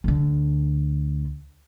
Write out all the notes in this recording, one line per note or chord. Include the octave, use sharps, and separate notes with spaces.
D2 D3